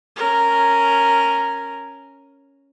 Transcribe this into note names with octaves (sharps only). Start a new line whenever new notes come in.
C#4 A#4